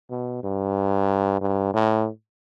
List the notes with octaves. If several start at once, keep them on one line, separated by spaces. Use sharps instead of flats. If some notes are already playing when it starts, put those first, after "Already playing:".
B2
G2
G2
A2